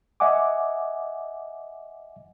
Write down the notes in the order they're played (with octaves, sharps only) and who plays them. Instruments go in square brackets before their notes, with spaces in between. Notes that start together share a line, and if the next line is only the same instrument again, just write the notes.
[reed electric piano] D#5 E5 F#5 G#5 D6